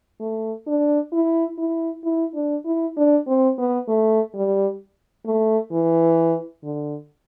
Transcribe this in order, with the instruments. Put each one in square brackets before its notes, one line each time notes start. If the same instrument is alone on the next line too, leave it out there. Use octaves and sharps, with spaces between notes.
[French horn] A3
D4
E4
E4
E4
D4
E4
D4
C4
B3
A3
G3
A3
E3
D3